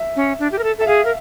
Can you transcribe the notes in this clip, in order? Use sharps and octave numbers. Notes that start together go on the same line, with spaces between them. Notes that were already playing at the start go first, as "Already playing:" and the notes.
Already playing: E5
C#4
D4
G4
A#4
A4
A4 E5
G#4 F5
A#4